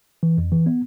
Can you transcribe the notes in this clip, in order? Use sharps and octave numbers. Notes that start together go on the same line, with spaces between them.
E3
F2
E3
B3